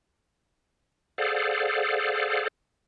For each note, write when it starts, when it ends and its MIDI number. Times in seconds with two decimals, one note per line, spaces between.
1.18 2.48 68
1.18 2.48 69
1.18 2.48 72
1.18 2.48 74
1.18 2.48 77
1.18 2.48 78